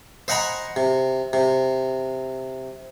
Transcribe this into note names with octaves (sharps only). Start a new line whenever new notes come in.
C5 D#5 F#5 G#5 A#5 B5
C3
C3